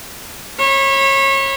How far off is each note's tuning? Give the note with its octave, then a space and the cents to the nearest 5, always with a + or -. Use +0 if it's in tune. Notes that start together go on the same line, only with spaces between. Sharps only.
C#5 -30 B5 +0